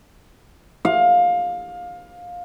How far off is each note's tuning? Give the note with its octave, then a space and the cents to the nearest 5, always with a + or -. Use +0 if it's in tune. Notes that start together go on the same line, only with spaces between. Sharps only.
F5 +20